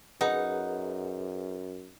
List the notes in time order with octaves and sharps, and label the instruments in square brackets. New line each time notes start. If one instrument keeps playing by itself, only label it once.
[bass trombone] F#2 [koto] D#4 [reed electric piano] G#4 B4 [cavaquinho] F#5